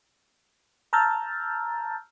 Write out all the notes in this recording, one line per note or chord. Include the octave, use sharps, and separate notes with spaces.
A5 A#5 E6 F6 G6 A6